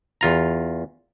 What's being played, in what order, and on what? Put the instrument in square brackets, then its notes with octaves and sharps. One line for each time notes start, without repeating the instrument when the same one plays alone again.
[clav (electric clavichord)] E2 F4 A#5